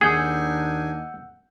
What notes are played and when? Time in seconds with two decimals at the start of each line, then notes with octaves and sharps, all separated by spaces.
0.01 D#2 D4 D#4 G#4 F#5 G#5 E6 G6